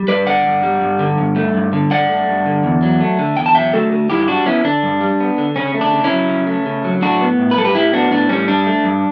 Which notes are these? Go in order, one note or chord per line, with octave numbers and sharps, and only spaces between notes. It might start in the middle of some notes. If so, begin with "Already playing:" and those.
Already playing: G3
G2 B4 D5
D3 D5 F#5
G2
G3
G2
D3
G2
A3
G2
D3
G2 D5 F#5
A3
G2
D3
E2
F#3
A3
D3
E2 G5
A5
F#3 E5 G5
A3 F#4 A4
D3
G2 E4 G4
G3 D4 F#4
B3 C#4 E4
D3 D4
G2
G3
B3
D3
C#3 C#4
A3
D4
C#3
C#4 E4
F#3
C#3
A3
C#3
F#3
A2 D4 F#4
B3
A2
B4
G3 A4
G4 B4
A2 E4 G4
B3 D4 F#4
A2 D4
G3 C#4
G2 D4
A3
G2